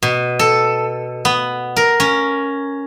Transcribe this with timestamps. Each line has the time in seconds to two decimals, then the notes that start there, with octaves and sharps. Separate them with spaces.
0.03 B2
0.39 A4
1.25 B3
1.77 A#4
2.00 C#4